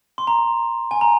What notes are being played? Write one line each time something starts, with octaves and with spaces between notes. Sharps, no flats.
C6
A#5
G#5
A#5